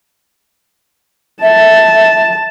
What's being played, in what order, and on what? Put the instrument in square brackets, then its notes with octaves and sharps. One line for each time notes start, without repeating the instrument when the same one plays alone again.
[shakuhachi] E5 [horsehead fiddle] A5